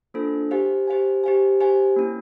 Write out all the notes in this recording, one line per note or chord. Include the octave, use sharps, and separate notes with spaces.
A#3 D4 F4 A4 C5
G4 C5 F5 G#5
G4 C5 F5 G#5
G4 C5 F5 G#5
G4 C5 F5 G#5
A#3 C#4 E4